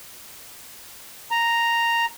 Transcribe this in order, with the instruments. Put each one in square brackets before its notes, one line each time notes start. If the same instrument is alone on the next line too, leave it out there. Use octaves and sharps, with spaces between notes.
[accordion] A#5